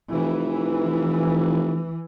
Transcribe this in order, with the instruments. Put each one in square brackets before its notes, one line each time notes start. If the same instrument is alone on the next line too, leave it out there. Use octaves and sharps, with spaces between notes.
[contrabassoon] F1 [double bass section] E3